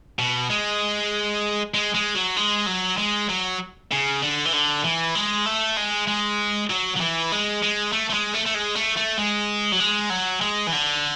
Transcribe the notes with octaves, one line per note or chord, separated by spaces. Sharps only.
B2
G#3
G#3
G#3
F#3
G#3
F#3
G#3
F#3
C#3
D3
E3
D3
E3
G#3
A3
G#3
G#3
F#3
F#3
E3
G#3
G#3
A3
A3
G#3
A3
A3
G#3
A3
A3
G#3
F#3
G#3
F#3
G#3
E3
D3